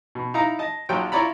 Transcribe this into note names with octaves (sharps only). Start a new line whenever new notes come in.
B2
D#4 E4 F5 A#5
D#5 A5
A#1 F3 F#3 F4 G5
E4 F4 C#5 D5 A#5 B5